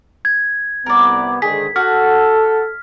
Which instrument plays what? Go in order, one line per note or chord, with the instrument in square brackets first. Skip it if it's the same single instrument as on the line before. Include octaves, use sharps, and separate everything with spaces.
[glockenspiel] G#6
[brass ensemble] C2 B3 [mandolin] A#4 D5
[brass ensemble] G#2 D3 D#3 [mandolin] G#4 [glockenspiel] B6
[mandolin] F#4 [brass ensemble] A4 [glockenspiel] F6